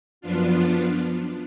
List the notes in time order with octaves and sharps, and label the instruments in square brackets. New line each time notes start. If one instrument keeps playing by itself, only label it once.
[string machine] F#2 F3 B3 D4 F4